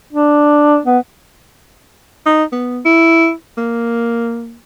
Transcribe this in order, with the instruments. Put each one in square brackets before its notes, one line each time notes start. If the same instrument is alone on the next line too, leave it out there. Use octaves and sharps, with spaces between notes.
[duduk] D4
B3
[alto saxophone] D#4
B3
E4
A#3